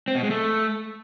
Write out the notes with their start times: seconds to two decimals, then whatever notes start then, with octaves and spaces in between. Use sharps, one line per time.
0.08 C4
0.15 B2
0.23 G#3
0.30 A3